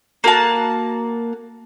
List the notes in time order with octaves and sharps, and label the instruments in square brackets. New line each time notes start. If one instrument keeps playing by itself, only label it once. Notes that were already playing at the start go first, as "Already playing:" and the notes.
[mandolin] A#3 F#4 A5